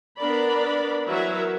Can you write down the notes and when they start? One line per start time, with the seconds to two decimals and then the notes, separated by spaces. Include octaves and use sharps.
0.18 B3 D4 A#4 D5 B5
1.07 E3 F#3 A#4 B4 E5